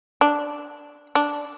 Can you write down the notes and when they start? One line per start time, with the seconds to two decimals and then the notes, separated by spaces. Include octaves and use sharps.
0.21 D4
1.15 D4